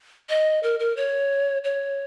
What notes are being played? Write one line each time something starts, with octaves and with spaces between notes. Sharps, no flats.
D#5
A#4
A#4
C#5
C#5